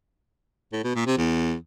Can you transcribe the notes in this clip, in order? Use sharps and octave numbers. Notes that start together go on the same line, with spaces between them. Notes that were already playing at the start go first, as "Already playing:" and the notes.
A2
B2
A#2
C3
E2